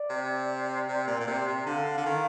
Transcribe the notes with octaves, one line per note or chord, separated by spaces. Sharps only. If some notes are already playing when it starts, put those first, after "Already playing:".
Already playing: D5
C3
C3
A#2
A#2
C3
C3
D3 F5
F5
D3
D#3